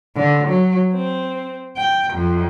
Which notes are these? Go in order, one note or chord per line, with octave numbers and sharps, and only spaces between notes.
D3
F#3
C4
G5
F2